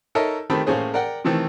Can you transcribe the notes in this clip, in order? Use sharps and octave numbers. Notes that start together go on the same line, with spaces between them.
D#4 A4 A#4 C#5 D#5 E5
D#3 A3 C4 G4 B5
A2 A#3 C#4 G#4 C5
A#4 D5 F#5 G5
C3 D#3 E3 A3 C4 A4